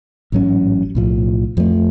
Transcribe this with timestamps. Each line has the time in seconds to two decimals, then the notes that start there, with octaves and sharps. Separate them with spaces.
0.32 A1 G#2 F#3 C#4
0.95 B1 A2 F3
1.57 F2 F3 A3